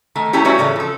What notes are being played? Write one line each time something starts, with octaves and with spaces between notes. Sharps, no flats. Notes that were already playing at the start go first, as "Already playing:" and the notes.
D#3 A3
A3 A#3 C#4 E4 G4 C#5
E3 G3 C#4 F#4 C#5 E5
A2 C#3 E3 A3
F3 A4